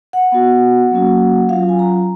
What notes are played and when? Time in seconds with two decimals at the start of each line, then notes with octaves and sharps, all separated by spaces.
0.13 F#5
0.32 B3 F#4
0.91 F#3 A#3 C#4 F#4
1.49 F#3 C#4 F4 F5
1.69 G#5
1.79 A#5